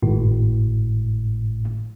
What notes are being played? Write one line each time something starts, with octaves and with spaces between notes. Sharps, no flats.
G#1 A2